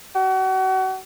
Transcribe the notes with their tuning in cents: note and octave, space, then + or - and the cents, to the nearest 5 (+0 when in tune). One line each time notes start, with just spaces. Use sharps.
F#4 +35